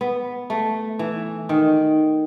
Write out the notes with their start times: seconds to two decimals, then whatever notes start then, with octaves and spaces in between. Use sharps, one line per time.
0.01 B3
0.50 A3
0.99 E3
1.49 D#3